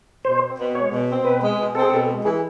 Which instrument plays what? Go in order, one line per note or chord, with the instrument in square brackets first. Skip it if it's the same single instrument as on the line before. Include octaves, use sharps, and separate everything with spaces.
[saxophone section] B2 [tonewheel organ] C5
[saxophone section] C4
B2
[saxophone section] G#3 [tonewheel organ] C#5
[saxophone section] B2
C4
[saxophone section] B2 [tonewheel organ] B4
[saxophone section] G#3
B2
[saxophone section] C4 [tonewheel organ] A4
[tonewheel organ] G#4
[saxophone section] B2 [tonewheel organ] A4
[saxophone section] G#3
[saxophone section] E3 [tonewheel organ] G#4